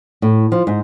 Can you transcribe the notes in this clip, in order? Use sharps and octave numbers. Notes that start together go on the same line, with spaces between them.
A2
F3
G#2